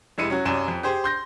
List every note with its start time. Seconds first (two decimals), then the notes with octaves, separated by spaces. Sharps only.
0.18 F1 G#3 E4 C#7 D#7
0.30 F#3 C#4 F#4
0.45 C2 F#2 C#4 E7
0.68 F2
0.83 G4 G#4 C5
1.04 C6 G6 A#6